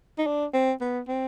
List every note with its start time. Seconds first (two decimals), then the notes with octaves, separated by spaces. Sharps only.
0.18 D#4
0.27 D4
0.54 C4
0.81 B3
1.08 C4